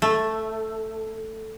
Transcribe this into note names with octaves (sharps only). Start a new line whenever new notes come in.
A3